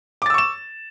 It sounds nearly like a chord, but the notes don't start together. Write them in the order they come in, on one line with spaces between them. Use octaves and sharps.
D6 A6 E6 C#6 E7